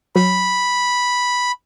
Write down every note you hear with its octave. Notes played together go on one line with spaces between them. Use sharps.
F#3 B5